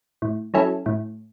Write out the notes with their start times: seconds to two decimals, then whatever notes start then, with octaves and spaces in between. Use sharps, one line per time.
0.22 A2
0.54 F#3 C#4 E4 A4
0.86 A2